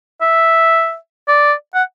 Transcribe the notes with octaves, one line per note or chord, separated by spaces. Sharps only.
E5
D5
F#5